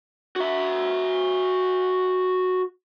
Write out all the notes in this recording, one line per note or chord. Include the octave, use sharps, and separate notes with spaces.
F#4 E5